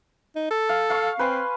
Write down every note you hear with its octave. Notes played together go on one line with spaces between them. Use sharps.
D#4
A4
F5
F5 C#6
C4 B4 G#5 C6